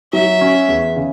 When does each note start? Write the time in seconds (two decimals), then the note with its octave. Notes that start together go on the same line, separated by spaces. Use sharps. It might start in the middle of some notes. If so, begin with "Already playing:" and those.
0.13 F#3 E5
0.41 C#4 F#4
0.68 E2
0.96 C#3